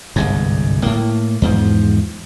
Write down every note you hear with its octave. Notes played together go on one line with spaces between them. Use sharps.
G1 C2 G#2
A2 A#3
E2 G#2 F3